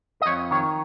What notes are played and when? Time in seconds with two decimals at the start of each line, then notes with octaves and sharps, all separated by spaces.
0.22 D#5
0.26 F2 C#5
0.51 D#3 C#5